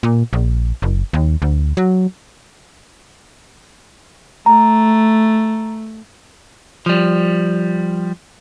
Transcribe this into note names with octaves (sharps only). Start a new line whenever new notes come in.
A#2
A#1
F#1
D#2
D2
F#3
A3 A#5
F3 G3